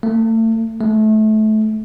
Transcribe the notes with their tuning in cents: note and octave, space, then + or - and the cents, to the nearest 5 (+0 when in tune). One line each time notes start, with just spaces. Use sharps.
A3 +35
A3 -25